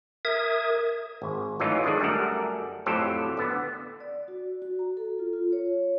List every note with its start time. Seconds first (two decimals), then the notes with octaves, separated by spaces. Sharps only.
0.25 A#4 E5 D#6 G#6
1.22 G#1
1.60 E3 F#3 A3 C#4 D#4 F4
1.84 D3 D#3 G#3 D4
2.00 F#2 G3 A3 A4 A#4 F#5
2.86 F2 A2 F#3 G4 A4 C5
3.37 D3 B3
4.00 D5
4.28 F#4
4.62 F#4
4.79 A#5
4.97 A4
5.19 F4
5.33 F4
5.52 C#5